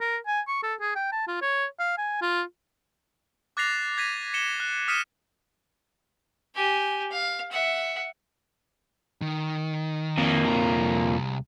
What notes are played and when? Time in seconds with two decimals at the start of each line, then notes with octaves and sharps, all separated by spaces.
0.01 A#4
0.27 G#5
0.47 C#6
0.63 A4
0.81 G#4
0.95 G5
1.12 A5
1.27 F4
1.42 C#5
1.79 F5
1.98 G#5
2.22 F4
3.57 D6 F#6 A6 A#6 C7 F7
3.98 G#6 A#6 B6 D#7
4.34 C#7 E7 G7
4.60 F#6
4.88 D#6 F6 B6 C#7 D#7 E7
6.55 G4 G#5
7.11 F5
7.51 E5 F#5
9.22 D#3
10.18 F2 A#3
10.46 C2 A#5